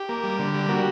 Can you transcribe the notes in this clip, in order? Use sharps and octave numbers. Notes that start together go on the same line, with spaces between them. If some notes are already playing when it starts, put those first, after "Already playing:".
Already playing: G4
A#3
G3
D3
G3
A#3 F#4